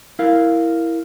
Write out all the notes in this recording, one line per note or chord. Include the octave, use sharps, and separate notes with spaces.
E4 A#4 F5